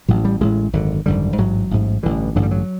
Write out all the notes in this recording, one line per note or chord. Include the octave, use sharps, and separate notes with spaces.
A1 A2 F#3
G3
A1 A2 G#3
G#1 F#2 D3
G#1 F#2 D3 G3
A1 G#2 F#3
A1 G#2
A1 G2 D3 E3
A1 G2 D3 F#3
G3
F#3